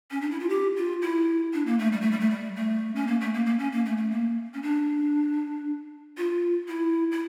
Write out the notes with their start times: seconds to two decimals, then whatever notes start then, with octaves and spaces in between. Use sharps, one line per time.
0.11 C#4
0.21 D4
0.31 E4
0.40 F4
0.49 G4
0.76 F4
1.02 E4
1.53 D4
1.67 A#3
1.79 A3
1.92 G3
2.01 A3
2.12 G3
2.20 A3
2.31 G3
2.56 A3
2.95 C#4
3.07 A#3
3.21 A3
3.34 A#3
3.46 A#3
3.59 C#4
3.72 A#3
3.86 A3
3.98 A3
4.11 A#3
4.54 C#4
4.62 D4
6.17 F4
6.68 E4
7.12 E4